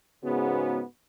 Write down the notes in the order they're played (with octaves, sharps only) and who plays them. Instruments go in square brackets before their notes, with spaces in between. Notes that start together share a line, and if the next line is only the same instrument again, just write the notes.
[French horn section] G#2 C#3 F#4 [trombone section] B3